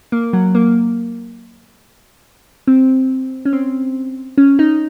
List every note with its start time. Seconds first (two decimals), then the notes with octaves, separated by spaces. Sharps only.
0.12 A#3
0.33 F#3
0.55 A#3
2.67 C4
3.45 C#4
3.53 C4
4.38 C#4
4.59 D#4